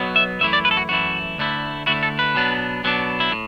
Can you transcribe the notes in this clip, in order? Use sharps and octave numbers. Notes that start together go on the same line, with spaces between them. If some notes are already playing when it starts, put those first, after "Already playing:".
Already playing: B1 B2 F#3 B3
E5
F#2 E3 A3 E4 E5
D5
B4
A4
F#4
F#2 E3 A3 E4 F#4
D2 D3 A3 E4
D2 D3 A3 E4 F#4
A4
B4
B2 F#3 B3 D4
B2 F#3 B3 D4
E4
A2